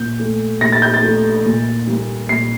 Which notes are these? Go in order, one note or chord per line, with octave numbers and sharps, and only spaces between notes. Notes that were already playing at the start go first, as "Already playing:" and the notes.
Already playing: A#2 G6
A3
A#2 A#6
A6
G6
A6
A3
A#2
G3 A#3
A#2 C7